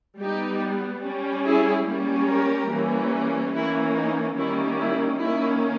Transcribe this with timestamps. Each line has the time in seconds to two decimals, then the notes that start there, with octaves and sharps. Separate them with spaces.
0.21 G3 B3 D#4 G4
1.04 G3 C#4
1.45 E4 G#4
1.88 G3 A#3 C#4
2.30 G4 A#4
2.71 E3 G3 A#3 C#4
3.54 E3 A#3 C#4 E4
3.97 D#4
4.37 D#3 G3 A#3 C#4 E4
4.79 E4
5.21 D#3 A#3 C#4 E4